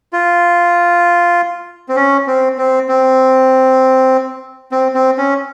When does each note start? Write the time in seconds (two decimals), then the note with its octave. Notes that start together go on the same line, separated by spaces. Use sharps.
0.13 F4
1.89 C4
1.96 C#4
2.27 C4
2.58 C4
2.89 C4
4.72 C4
4.95 C4
5.18 C#4